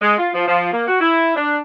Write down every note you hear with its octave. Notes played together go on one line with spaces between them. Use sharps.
G#3
F4
F3
F3
A#3
F#4
E4
D4